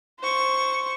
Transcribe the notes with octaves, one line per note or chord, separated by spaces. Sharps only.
C5 C#6